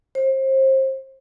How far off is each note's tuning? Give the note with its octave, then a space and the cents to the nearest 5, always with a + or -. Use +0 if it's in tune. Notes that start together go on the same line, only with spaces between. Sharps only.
C5 +30